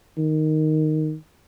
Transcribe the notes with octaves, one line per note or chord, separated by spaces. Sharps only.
D#3